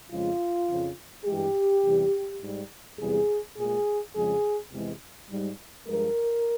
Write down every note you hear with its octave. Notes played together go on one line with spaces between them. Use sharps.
F2 C#3 F3 G#3 F4
F2 C#3 F3
G2 E3 G#3 G4
E2 C3 E3 G3
G#2 G3
E2 C3 G3 G#4
A#2 G#3 G#4
F2 C#3 F3 G#3 G#4
E2 C3 E3 G#3
G#2 G3
G2 F3 G#3 A#4